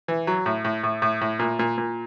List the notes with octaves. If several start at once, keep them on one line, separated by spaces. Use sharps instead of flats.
E3
F#3
A2
A2
A2
A2
A2
A#2
A#2
A#2